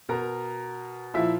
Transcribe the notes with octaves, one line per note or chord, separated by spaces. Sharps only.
B2 A#4 A#5
A#2 F3 E4 E5